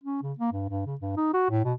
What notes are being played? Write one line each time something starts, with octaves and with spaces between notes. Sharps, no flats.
C#4
C#3
A#3
G2
G2
C#3
G2
D#4
F#4
A2
B2